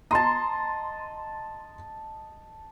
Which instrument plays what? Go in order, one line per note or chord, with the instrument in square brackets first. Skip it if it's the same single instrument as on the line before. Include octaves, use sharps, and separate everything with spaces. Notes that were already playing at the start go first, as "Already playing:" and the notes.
[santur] D#5 A5 [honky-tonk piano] A#5 C6